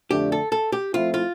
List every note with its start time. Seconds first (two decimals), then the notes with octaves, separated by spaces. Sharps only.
0.11 F2 D3 A3 D4 G4
0.32 A4
0.52 A4
0.72 G4
0.93 F3 A3 C4 E4 F4
1.14 F4